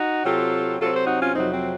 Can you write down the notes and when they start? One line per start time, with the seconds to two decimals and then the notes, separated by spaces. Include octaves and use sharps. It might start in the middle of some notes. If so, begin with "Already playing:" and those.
Already playing: D#4 F#4
0.25 C3 F#3 C4 F4 A4
0.79 C3 F#3 C4 F4 A4
0.93 A4 C5
1.06 D#4 F#4
1.20 C#4 F4
1.34 F2 C3 F#3 C4 D#4
1.52 C4